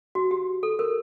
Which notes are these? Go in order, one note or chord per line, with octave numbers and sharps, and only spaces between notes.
F#4
G4
A4
A#4